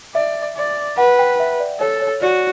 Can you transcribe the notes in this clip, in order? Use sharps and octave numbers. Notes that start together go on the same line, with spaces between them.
D5 E5
D5
B4 F#5
G5
E5
D5
A4 C#5
C#5
F#4 D5